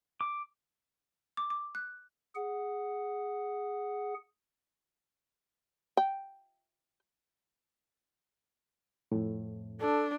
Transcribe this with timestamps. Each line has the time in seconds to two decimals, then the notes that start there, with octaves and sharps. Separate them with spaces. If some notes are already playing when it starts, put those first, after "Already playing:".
0.21 D6
1.37 D6
1.50 D6
1.75 F#6
2.35 G#4 F#5
5.97 G5
9.12 F2 A2
9.81 D4 A4